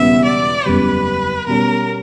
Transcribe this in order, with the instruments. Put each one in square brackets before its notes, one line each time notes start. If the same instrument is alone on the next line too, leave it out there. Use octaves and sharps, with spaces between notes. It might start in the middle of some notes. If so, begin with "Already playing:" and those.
Already playing: [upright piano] E1 E2 C#3 G3 B3 [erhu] E5
[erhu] D5
[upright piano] F#1 E2 C#3 G3 [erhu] B4
[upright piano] B2 G3 C#4 [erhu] A#4